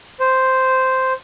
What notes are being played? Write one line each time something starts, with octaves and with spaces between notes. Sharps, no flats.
C5